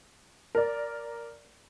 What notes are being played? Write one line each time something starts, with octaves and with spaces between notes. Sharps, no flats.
A#4 D5